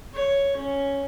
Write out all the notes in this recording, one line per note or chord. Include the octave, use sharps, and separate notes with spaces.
C#5
C#4